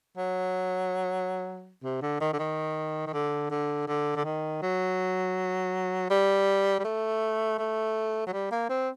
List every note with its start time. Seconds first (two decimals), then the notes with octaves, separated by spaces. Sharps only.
0.17 F#3
1.83 C3
2.02 D3
2.21 D#3
2.33 D3
2.39 D#3
3.07 D#3
3.13 D3
3.51 D3
3.88 D3
4.16 D3
4.25 D#3
4.62 F#3
6.10 G3
6.79 G3
6.84 A3
7.59 A3
8.27 F#3
8.33 G3
8.51 A#3
8.70 C4